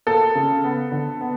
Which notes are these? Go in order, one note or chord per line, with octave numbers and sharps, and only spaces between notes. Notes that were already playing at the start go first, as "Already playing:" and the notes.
A#3 A4
C#3
B3
D3
B3